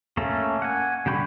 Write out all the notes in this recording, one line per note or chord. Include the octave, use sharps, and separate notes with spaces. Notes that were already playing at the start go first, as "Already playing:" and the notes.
A3 A#3 C#4 A4
F#5 G#5
D3 G3 G5 B5 C#6